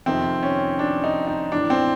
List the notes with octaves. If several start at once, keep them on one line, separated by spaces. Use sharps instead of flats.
F2 C3 D#3 C4
C#4
D4
D#4
D#4
A2 E3 D4
C4